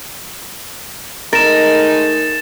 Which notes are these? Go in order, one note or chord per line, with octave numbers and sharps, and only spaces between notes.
G#3 A3 D#4 A#4 A6 E7